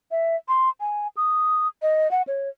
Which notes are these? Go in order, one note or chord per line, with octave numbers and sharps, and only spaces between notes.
E5
C6
G#5
D#6
D#5
F#5
C#5